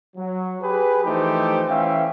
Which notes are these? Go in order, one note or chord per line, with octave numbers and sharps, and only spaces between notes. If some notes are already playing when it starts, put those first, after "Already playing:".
F#3
G4 G#4 B4
E3 F3 A3 D#4 G4 C5
E3 C#4 E5 F5 G5